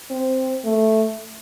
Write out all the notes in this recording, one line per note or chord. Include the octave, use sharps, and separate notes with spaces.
C4
A3